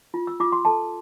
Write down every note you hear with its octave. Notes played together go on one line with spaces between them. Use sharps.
F4
E6
F4 D6
C6
A4 A5